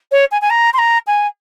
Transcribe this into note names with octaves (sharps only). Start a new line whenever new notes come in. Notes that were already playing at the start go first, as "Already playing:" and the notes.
C#5
G#5
G#5
A#5
C6
A#5
G#5